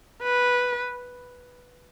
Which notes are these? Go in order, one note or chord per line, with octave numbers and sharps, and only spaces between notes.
B4